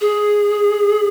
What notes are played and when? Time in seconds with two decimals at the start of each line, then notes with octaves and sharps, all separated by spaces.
0.01 G#4